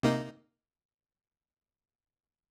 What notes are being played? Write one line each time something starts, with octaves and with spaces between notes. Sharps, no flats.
C3 A#3 D#4